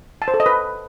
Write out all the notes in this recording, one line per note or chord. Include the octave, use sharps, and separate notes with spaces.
A5
C5
A4
D#5
B4